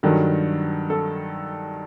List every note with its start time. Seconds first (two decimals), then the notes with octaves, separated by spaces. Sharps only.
0.03 G2 D#3 F#3 A4
0.90 A4